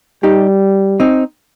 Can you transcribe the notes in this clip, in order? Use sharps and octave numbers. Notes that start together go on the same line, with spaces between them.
G3 D#4 G4
C4 D#4